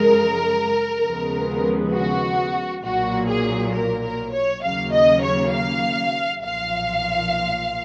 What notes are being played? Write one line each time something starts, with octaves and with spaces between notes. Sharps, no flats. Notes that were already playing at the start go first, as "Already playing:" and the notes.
Already playing: F#2 C#3 F3 G#3 A#4
D#2 C#3 F3 G#3 B3
F#4
B1 A#2 F#3 A#3 F#4
G#4
A#4
A#4
C#5
D#2 C#3 F#3 A#3 F5
D#5
C#5
F5
B1 A#2 F3 F5